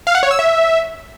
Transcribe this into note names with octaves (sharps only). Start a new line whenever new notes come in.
F5
F#5
C#5
E6
E5